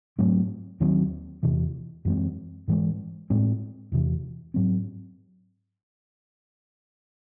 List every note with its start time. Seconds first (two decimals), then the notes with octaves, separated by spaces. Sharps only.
0.19 G#2 F#3 A3 C4
0.80 D#2 D#3 F#3 C4
1.43 E2 C3 E3
2.05 F#2 E3 G#3 C4
2.68 G#2 E3 G#3
3.30 A2 G#3 C4
3.92 E2 C3 E3
4.54 G#2 F#3 C4